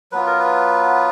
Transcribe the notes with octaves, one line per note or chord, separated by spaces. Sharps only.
F#3 B3 F4 B4
A#4
B4